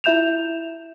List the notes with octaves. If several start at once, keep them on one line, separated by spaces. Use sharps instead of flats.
E4 F4 E5 G6 E7 F7